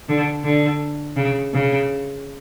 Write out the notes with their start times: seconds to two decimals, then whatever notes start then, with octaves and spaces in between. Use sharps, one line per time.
0.09 D3
0.45 D3
1.16 C#3
1.53 C#3